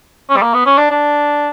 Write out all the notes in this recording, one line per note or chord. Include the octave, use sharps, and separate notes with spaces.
C#4
G3
A#3
B3
C#4
D4
D4